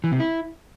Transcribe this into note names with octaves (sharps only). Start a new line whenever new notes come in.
E3
C3
E4